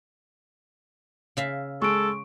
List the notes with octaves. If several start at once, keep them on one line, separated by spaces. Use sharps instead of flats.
C#3 E5 F5
G#3 A4 C#6 D7